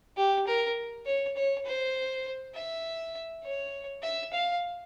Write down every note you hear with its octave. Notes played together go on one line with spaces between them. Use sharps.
G4
A#4
C#5
C#5
C5
E5
C#5
E5
F5